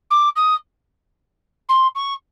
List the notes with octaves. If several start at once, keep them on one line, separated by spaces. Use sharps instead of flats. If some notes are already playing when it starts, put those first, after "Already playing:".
D6
D#6
C6
C#6